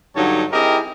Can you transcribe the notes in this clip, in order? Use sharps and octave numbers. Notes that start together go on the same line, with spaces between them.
G2 D3 F#3 D#4 C#5 A5
C4 E4 G4 G#4 A#4 D#5